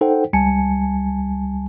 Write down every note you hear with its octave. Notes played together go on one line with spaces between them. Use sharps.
D#4 A4 C5 F#5 G5
C#2 G3 G#5 A5 C#7